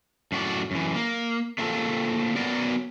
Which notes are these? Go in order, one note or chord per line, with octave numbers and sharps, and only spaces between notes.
F#2 A2 F#4 G4 D5
F#2 E3
A#3
A3 A#3 C4 F4 G4 A4
F#3 B3 A#4 D5